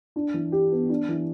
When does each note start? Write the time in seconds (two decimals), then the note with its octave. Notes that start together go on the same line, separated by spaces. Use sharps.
0.16 D4
0.34 E3
0.52 G4
0.72 B3
0.90 D4
1.09 E3